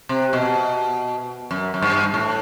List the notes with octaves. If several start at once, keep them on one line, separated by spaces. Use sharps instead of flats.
C3
B2
F#2
F#2
G2
A2